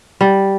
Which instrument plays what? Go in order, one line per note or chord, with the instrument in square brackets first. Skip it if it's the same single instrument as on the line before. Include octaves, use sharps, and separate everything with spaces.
[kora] G3